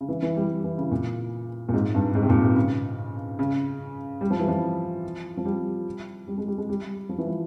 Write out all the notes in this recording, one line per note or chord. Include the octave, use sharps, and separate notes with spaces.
C#3
E3
E3
G3
E3
C#3
A#2
A#2
G#2
G2
G#2
C3
A#2
C3
C#3
C#3
G3
F3
E3
F3
F3
G3
G3
G#3
G3
G#3
G3
F3
E3
F3